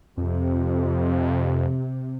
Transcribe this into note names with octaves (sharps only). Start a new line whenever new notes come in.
F2 C3